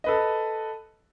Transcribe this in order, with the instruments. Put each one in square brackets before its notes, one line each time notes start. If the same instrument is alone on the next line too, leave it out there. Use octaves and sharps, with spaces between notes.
[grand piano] A4 B4 D#5